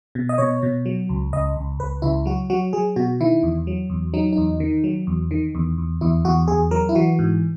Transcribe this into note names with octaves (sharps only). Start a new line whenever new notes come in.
B2
D#5
B2 C#5
B2
F#3
C#2
C#2 D#5
C#2
C#2 B4
C#2 E4
F#3 F#4
F#3 F#4
F#3 G#4
B2 F#4
D#3 E4
E2
F#3
E2
F#3 D#4
E2 D#4
D#3
F#3
E2
D#3
E2
E2
E2 E4
E2 F#4
E2 G#4
F#3 A#4
E4
E3 F#4
G#2